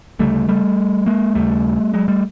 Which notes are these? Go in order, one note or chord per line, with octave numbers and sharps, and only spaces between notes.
D2 C#3 G3 A3
G3 A3
G#3 A#3
D#2 C#3 G3 A3
F#3 G#3
G3 A3